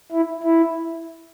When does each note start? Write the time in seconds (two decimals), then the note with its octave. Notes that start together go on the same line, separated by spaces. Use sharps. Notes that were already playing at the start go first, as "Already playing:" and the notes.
0.12 E4
0.43 E4